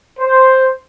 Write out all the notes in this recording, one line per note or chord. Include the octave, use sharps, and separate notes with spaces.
C5